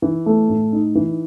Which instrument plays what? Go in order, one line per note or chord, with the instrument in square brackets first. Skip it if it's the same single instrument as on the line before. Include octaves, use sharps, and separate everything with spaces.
[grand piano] E3
A3
A2
D#4
E3